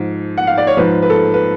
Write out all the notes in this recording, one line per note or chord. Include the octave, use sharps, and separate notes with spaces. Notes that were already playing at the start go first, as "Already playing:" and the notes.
Already playing: G#2 F3
F#5
F5
D5
C#5
G#2 F3 B4
B4
A4
B4